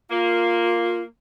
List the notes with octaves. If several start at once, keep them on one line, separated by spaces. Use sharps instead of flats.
A#3 F4